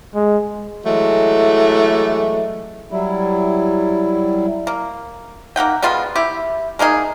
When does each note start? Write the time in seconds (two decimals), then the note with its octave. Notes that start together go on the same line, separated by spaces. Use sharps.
0.15 G#3
0.85 E3 F#3 G#3 A3
2.91 F#3 G3 E4
4.67 A#3
5.56 A#3 D#4 F#5 G5
5.82 G3 G#3 B3 F4
6.16 E4 G4
6.79 G#3 A#3 D#4 G#4